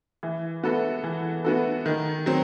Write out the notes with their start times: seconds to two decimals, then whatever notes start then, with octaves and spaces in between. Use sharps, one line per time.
0.23 E3
0.63 B3 F#4 A4
1.04 E3
1.45 B3 F#4 A4
1.86 D#3
2.26 F#3 C4